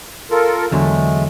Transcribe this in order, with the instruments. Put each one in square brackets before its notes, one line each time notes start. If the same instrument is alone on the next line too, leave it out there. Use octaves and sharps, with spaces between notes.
[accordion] F4 A4 A#4
[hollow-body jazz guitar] E2 D3 F#3 [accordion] G#3 A3